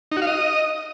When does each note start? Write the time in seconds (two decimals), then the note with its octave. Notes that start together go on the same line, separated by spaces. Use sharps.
0.12 D#4
0.17 F#4
0.22 F5
0.27 D#5